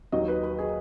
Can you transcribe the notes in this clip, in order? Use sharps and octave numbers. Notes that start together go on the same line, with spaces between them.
D#2 D#3 F#3 D#5
B4
B4
G#4